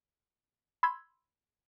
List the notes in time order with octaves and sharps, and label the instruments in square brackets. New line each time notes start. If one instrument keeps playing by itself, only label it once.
[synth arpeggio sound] B5 C6 E6 G#6